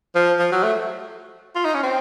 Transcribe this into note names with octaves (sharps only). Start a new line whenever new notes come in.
F3
F3
F#3
A3
F4
D#4
C#4
C4